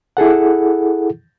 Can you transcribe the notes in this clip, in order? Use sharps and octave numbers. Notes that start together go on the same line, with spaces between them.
E4 G#4 A4 F#5